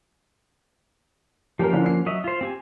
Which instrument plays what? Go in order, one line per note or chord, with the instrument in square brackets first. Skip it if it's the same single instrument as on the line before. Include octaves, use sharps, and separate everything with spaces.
[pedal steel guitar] F3 A#3 C#4 [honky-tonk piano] G4 A#4
[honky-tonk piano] D3 D4 E4
C7
[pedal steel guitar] F#3 D#5 E5
F4 C5
C4 G4 G#5